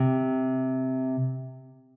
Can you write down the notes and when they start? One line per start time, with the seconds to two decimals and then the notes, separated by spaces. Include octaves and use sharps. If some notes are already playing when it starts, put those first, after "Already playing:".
Already playing: C3